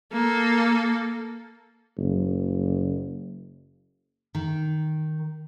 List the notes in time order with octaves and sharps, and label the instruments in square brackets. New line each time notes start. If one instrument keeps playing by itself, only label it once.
[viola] A#3 A4
[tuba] F#1
[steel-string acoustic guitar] D#3